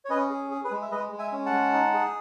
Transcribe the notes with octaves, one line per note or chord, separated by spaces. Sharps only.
C#5
C#4 B4 D#5
G#4
G#4
G#4 B4
G#3
E5
G#3 B4 D#5
G#3
E5 G#5
C#4
F#5 A5
G#3
D#4
G#4